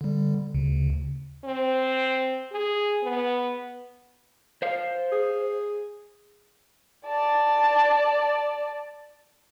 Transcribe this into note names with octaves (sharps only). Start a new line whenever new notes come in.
D3 G3
D2 C#3
C4
G#4
B3
C5 F5
G#4
D5 A5